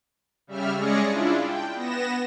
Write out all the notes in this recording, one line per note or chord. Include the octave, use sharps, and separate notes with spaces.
C#3 G3 E5 F6
G#3 C#4 G#4 D5 A#6 C#7
D4 E4 F4
G5
B3 A#6 E7